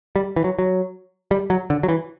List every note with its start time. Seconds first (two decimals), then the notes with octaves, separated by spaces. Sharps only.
0.16 G3
0.36 E3
0.44 F#3
0.59 F#3
1.31 G3
1.50 F#3
1.70 D3
1.83 F#3
1.88 E3